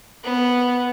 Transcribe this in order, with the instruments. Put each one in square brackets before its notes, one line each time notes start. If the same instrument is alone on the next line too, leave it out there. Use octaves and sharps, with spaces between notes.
[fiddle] B3